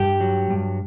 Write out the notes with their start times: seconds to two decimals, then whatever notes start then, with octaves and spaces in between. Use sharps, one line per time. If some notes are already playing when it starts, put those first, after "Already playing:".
Already playing: G2 G4
0.21 F#3
0.50 G2